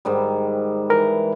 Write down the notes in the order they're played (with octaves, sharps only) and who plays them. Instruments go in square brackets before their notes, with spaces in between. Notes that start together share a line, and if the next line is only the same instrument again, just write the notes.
[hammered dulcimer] G#2 D#3 G3
[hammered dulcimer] E3 [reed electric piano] A#4